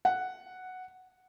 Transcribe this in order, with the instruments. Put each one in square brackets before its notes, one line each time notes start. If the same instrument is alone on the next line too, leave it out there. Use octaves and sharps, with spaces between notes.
[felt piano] F#5